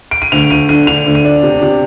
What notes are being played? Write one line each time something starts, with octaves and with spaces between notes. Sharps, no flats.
D7
D#7
D2 F7
D2 D#7
D3 D#7
D3 F7
D2
D#7
D4
C3
C3